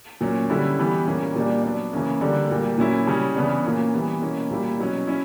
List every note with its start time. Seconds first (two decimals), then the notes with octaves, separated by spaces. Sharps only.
0.21 A#2 F#3 C#4
0.50 D3 G3 C#4 E4
0.79 E3 G3 B3
1.07 A#2 G3 A#3 C#4
1.36 A#2 G3 A#3 D4
1.64 F#3 B3 D4
1.93 C#3 E3 A#3 C#4
2.21 D3 G3 A#3 D4
2.50 A#2 G3 A#3
2.78 A#2 F#3 C#4 E4
3.07 C#3 G3 C#4
3.36 C#3 E3 B3 D4
3.64 A#2 A#3 C#4 E4
3.94 E3 G3 B3
4.22 B2 A#3 C#4 E4
4.50 A#2 G3 A#3 E4
4.78 B2 F#3 C#4
5.07 C#4 E4